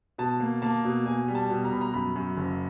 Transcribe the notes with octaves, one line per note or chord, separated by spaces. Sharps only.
B2 A5
A#3
A#3 A5
B2
B2 G#5
G3
A5
B2
A#5
B2 B5
A#5
F#2 B5
F#2
F#1